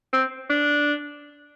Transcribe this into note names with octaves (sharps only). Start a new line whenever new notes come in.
C4
D4